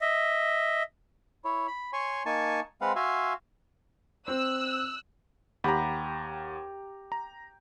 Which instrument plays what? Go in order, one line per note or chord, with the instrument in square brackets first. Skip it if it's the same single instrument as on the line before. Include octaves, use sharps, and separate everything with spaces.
[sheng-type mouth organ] D#5 E5
[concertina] E4 C#5
B5
C#5 G#5 C6 C#6
A#3 D#4 G#5 A5 C#6
G#3 C4 B4 F5 F#5
F#4 E5 F5 G#5 C6
[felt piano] C4 [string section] E6 F#6
[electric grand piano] D#2 F#5 B5 [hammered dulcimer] G4 A#5
[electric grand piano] A#5